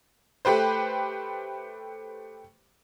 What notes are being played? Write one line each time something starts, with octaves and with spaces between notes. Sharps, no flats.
A3 G4 B4 C5